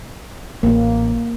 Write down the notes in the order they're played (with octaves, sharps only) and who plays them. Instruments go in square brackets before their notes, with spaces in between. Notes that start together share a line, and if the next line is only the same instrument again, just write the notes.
[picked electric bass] A1 [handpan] A#3